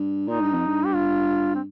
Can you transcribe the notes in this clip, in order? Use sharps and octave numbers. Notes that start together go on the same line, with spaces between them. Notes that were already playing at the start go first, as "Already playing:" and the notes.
Already playing: G2
A#2 D#4
G2
F2
G2
G4
F4
C4